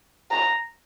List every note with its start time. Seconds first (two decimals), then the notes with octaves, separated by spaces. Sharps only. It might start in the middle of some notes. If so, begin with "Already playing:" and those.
0.31 A#5